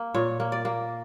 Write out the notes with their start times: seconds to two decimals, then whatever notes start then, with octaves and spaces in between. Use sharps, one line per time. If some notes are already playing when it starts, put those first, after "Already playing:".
Already playing: A#3
0.14 A#2 C#5
0.40 A#3
0.52 D5
0.65 A#3